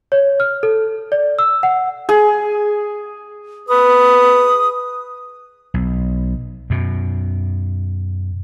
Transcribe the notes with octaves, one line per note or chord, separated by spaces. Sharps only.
C#5
F6
A4
D5
E6
F#5
G#4
B4 D#6
B1
F#2 B2